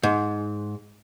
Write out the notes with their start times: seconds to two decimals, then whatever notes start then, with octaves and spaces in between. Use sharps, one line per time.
0.03 G#2